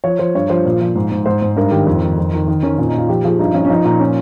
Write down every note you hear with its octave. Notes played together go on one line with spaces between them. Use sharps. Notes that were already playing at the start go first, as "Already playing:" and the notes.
F3 C#5
F3 C5
G2 C#5
F3 C5
A#2
F3
G#2
G#2
G#2 C5
G#2
G2 A#4
D#3 G4
F2
D#3
F2
D#3
D#3
D#3 C#4
A#2 C#4
D#4
A#2 F4
F3 G4
F3 G#4
G2 D#4
F3 C#4
C#4
F3 D#4
A#2 D#4
C#4